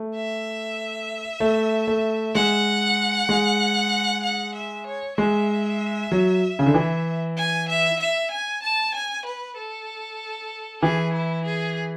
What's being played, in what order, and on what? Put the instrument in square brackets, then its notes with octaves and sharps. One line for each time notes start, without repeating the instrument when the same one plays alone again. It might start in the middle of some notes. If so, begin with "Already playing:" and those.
Already playing: [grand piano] A3
[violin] E5
[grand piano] A3
A3
[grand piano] G#3 [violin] F#5
[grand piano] G#3
[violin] F#5
E5
C#5
[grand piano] G#3 [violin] E5
[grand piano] F#3
C#3
D3
E3
[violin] G#5
E5
E5
G#5
A5
G#5
B4
A4
[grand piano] E3 [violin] G#4
[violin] E4
G#4